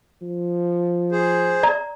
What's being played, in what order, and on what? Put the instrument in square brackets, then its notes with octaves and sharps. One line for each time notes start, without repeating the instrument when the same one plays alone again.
[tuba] F3
[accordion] G#4 C5
[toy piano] D5 A#5